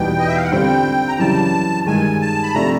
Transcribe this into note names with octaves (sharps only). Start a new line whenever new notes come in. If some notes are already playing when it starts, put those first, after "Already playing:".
Already playing: E2 B2 G3 B3 D#4 G5
D#5
E5
F5
F#5
D3 G3 C4 F4 G5
A#5
F#2 C#3 E3 G3 A5
G2 D#3 G#3 G#5
A5
B5
C3 F3 A3 D4 A#5